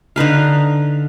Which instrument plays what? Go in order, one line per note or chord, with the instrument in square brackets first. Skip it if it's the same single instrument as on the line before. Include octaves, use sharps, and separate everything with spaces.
[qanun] D3 D#4 B4 F5